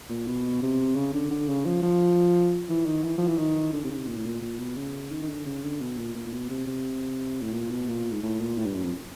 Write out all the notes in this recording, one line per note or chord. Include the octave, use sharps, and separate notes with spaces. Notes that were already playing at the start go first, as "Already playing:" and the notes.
A#2
B2
C3
C#3
D3
D3
C#3
F3
F3
E3
D#3
E3
F3
E3
D#3
D3
C3
C#3
C3
A#2
A2
A#2
A#2
B2
C#3
D#3
D#3
D3
C#3
D3
B2
A#2
A#2
A#2
B2
C3
C3
A2
A#2
B2
A#2
G#2
A2
A#2
A2
G2
F#2
F2